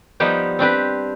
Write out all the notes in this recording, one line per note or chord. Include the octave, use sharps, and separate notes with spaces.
F3 G3 B3 D#4 G4
C4 D4 G4 B4